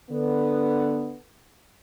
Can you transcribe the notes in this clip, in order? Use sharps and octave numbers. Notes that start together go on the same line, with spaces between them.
D3 B3